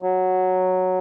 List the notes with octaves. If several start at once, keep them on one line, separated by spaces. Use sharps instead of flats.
F#3